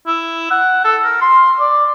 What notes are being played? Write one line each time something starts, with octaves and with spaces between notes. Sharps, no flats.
E4
F#5
A4
A#4
C6
D5